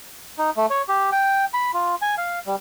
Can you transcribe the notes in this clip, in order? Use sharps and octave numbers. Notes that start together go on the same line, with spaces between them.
D#4
A3
C#5
G4
G5
B5
F4
G#5
F5
G3